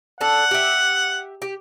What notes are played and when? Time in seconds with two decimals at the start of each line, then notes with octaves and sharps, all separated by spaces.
0.21 D4 A4 F#5
0.51 G4 E5
1.42 G4